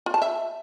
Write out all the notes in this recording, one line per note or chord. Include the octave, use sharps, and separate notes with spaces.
F4
A5
E5